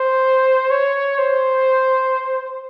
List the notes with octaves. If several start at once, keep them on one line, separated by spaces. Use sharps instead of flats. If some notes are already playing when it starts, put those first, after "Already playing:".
Already playing: C5
C#5
C5